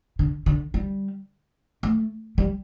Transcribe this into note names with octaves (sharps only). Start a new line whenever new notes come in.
D3
D3
G3
A3
G3